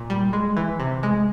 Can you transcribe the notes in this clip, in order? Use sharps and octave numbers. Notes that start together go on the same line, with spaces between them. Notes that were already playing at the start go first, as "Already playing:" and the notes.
Already playing: A#2
G3
G#3
E3
C3
G#3